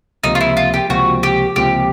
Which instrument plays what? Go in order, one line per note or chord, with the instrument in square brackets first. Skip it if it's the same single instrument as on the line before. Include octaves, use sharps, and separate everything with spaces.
[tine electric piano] C#2 C3 F3 A#3 [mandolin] D#4
[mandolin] F4
E4
F4
G4
[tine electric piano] C#2 C3 F3 A#3 [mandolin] F#4
[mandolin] G4
[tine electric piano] C#2 C3 F3 A#3 [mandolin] G4